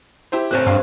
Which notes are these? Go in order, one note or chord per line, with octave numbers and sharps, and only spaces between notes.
E4 G4 C5
F1 A#1 C4 C5 C#5 F#6
G2 F5